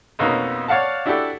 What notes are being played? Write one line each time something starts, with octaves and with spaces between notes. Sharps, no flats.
F2 B2 A#3 C#4 D#4
C#5 D5 F5 F#5 A5
D4 E4 F#4 G4 A4 D5